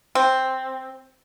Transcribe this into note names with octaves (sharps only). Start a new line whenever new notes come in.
C4